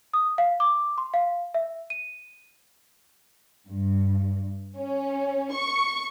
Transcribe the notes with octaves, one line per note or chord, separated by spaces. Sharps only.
D#6
F5
D6
C6
F5
E5
D#7
G2
C#4
C#6